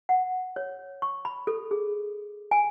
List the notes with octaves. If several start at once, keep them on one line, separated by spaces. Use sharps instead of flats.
F#5
C#5
C#6
B5
A4
G#4
G#5